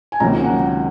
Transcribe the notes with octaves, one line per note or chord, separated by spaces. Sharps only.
G#5
C#2 C3 D#3 F#3 A#3 A#5
F#5